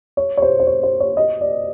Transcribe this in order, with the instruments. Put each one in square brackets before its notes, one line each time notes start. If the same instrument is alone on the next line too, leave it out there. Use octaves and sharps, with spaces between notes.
[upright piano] C#5
C#5
C5
C5
C#5
C5
C#5
D#5
D5